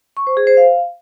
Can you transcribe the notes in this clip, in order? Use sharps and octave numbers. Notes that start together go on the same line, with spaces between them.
C#6
C5
G#4
C5
F5